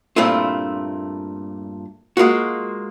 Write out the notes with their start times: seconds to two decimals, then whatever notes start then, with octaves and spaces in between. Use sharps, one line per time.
0.16 G2 A#2 A3 C4 E4 F4
2.17 G#3 A#3 F4 F#4